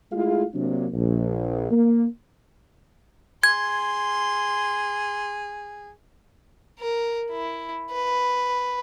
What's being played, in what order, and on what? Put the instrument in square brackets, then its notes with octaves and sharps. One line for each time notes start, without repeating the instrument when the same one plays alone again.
[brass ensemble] G#3 A3 E4 F4 G#4 F5
C3 F#3 A#3 C4 D4
A#1
A#3
[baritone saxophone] G#4 [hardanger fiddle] C6 [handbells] G#6
[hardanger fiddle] A#4
E4
B4